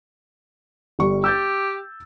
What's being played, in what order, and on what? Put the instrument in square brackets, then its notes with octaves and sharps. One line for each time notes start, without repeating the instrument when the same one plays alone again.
[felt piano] G1 G3 C#6
[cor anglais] G4 [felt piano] E6 G6 A6